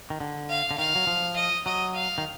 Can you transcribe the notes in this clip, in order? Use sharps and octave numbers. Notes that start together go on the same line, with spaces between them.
D#3
D3
F5
D3
D#3 F5
F#3
F3
D#5
F#3 D#5
F5
D#3